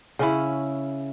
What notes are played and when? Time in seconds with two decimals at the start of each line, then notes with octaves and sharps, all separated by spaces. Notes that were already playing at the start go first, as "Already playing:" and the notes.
0.19 C#3 C#4 E4